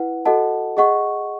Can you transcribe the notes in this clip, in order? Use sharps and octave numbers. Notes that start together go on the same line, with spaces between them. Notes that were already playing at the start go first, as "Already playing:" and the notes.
Already playing: E4 B4 F#5
F#4 A4 D#5 F#5 A5
G#4 D#5 F#5 C#6